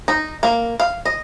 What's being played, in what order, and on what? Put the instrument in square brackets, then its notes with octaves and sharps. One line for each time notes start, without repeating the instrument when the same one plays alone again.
[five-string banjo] D#4
A#3
F5
D#5